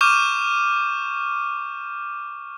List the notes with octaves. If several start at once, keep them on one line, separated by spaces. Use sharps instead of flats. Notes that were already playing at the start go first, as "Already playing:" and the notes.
C#6 D6 F6 G6 D#7 E7